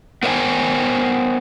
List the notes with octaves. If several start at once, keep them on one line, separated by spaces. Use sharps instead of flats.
B3 A#4 C5 D#5 G5 G#5